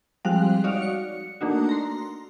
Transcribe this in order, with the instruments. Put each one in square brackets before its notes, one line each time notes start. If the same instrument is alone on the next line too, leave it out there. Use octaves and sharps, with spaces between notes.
[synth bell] F3 G3 G#3 C4 F5 F#6
D#4 F#4 C#5 D5 F5
C#7
A3 A#3 D4 D#4 F#4
A#5 C6